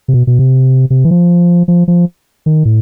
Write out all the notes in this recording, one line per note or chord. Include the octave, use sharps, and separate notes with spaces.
C3
B2
B2
C3
C3
E3
F3
F3
F3
D#3
A2